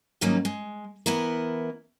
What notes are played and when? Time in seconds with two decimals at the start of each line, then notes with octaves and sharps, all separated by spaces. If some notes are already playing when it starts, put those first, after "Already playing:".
0.21 G#2 D#3 F#3 G3 A#3 C#4
0.45 G#3
1.06 E3 B3 E4 A#4